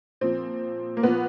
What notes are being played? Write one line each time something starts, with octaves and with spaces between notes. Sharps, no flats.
A#2 F3 C4
A#3
A#2 F3 B3